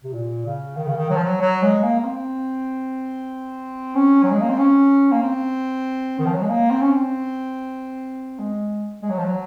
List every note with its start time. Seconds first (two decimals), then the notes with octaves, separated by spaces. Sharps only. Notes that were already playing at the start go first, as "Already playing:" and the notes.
0.04 C3
0.14 A#2
0.46 C#3
0.77 D#3
0.88 C#3
0.96 D#3
1.10 F#3
1.16 F3
1.24 F#3
1.41 F#3
1.63 G#3
1.83 A#3
2.00 A#3
2.04 C4
3.95 C#4
4.23 F#3
4.31 G#3
4.41 A#3
4.50 C4
4.58 C#4
5.12 A#3
5.23 C4
6.19 D#3
6.26 F3
6.35 F#3
6.42 G#3
6.49 A#3
6.71 C4
6.81 C#4
6.91 C4
8.39 G#3
9.03 G#3
9.10 F#3
9.19 F3
9.25 F#3